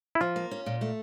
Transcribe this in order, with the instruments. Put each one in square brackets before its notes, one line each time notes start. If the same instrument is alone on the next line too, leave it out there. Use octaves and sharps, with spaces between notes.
[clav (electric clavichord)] E4
[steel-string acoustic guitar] F3 [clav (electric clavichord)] F4
[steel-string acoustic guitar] A#3
C#4
A#2
A3